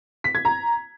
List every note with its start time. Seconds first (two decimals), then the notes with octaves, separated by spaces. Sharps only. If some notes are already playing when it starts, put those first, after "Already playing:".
0.24 B6
0.35 G#6
0.45 A#5